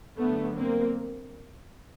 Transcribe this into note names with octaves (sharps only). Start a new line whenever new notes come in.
G2 D3 F#3 A3 B3
A#3 C4